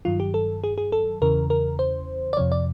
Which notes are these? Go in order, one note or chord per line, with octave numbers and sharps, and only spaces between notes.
G2 D#3 F#3 F4
G4
A4
G#4
G#4
A4
E2 C#3 E3 A#4
A#4
C5
D5
F2 C3 F3 C#5
D5